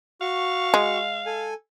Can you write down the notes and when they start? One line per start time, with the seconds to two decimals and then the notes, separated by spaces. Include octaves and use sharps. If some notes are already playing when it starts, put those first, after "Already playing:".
0.21 F#4 F5 C#6
0.74 G#3
1.26 A4 G#5